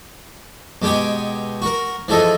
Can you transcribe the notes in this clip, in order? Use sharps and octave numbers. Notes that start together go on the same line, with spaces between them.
B2 G#3 G4 G5 G#5
F#4 A#4
E3 F3 G#4 A4 D#5